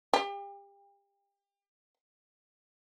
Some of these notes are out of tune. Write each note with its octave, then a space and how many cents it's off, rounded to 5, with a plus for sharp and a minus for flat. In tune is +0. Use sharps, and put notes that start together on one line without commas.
G4 +35